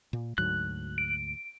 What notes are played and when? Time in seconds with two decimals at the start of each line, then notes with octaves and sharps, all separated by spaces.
0.13 A#2
0.38 D2 G#2 F#3 F#6
0.98 D7